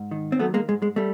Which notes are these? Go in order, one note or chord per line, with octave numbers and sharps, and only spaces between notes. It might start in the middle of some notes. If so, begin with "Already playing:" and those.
Already playing: G#2
D#3
C4
F#3 A3 B3
G#3 A#3
G#2 G#3
G#3
G3 A3